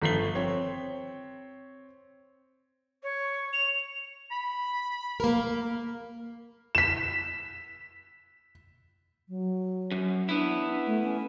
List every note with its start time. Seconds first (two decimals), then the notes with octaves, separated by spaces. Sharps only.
0.02 G1 F3 B6 C7 G7
0.35 C4 C#5
3.03 C#5
3.53 F7
4.31 B5
5.20 A#3 A#4
6.75 B6 E7
9.28 F#3
9.92 F#2
10.29 B3 D4 E4
10.86 A3
11.03 C#4